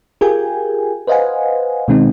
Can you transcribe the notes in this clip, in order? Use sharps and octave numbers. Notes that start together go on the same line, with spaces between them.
F4 G4 G#4 A#4 G5 G#5
B4 C5 D#5 F5 F#5 G#5
B2 D#3 G#3 C4 D#4